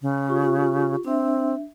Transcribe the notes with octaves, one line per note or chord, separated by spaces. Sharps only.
C#3
F4 G4 C#6
C4 D4 E5